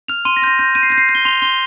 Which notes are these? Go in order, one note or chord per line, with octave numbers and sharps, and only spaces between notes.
F6 F7
C6 D#7
A#6
C6 G6 A#6
G6 A#6
G6 D#7
C7
G6 A#6
C7
G6
G7
C6 F7
C6 G7